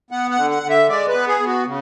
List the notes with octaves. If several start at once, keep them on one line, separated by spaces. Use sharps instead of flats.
B3 F#5
F#5
D3
F#5
D3
E5
G#3 D5
B4
B3
G#4
B3
F#4
C#3